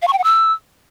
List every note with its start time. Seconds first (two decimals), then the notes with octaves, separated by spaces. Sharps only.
0.02 F5
0.07 C#6
0.13 G5
0.18 F#5
0.24 E6